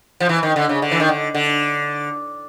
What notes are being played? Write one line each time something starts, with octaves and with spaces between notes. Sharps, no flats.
F3
E3
D#3
D3
C#3
D3
E3
D#3
D3
D3